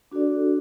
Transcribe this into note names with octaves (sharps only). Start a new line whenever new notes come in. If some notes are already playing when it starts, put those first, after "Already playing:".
D4 F#4 A4 D5